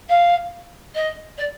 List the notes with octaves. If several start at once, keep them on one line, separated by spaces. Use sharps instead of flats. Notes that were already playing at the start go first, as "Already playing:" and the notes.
F5
D#5
D5